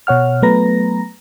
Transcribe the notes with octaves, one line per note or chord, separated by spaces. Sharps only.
B2 C#5 F#5 F6
F#3 A3 B3 B4 A#5 A#6